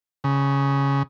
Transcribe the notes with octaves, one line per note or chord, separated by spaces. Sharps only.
C#3